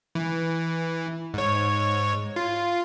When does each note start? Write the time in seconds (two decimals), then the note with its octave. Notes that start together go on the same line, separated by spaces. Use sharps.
0.15 E3
1.34 G#2 C#5
2.36 F4